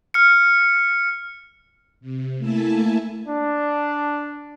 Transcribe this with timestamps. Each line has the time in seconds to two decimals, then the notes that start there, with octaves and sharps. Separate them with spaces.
0.14 F6 C#7
2.01 C3
2.38 A3 A#3 E4 E5 G#5 A5
3.27 D4